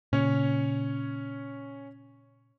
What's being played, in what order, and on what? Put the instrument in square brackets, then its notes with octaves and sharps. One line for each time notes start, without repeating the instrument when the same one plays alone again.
[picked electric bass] A#2 C#3 [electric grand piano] C#4 C#5